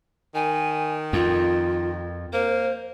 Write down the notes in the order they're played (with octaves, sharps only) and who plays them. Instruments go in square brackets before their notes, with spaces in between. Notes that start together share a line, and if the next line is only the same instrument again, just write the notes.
[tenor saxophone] D#3 [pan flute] G#5
[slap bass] F2 [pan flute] F4
[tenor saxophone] A#3 [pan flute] C5